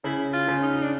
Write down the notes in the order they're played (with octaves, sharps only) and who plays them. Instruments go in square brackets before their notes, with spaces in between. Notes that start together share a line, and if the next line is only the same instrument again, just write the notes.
[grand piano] C#3 [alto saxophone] E4
[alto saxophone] F4
[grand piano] C#3
[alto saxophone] D#4
D4